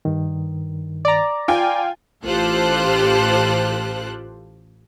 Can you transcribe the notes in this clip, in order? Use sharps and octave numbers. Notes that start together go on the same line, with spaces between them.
G2 D#3
D5 A#5
F4 G5 G#5 D6
A1 F4 G4 A4 C5 F#6